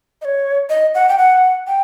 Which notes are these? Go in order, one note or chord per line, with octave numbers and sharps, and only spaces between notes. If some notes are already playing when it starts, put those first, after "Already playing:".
D#5
C#5
D#5
F#5
G5
F#5
G5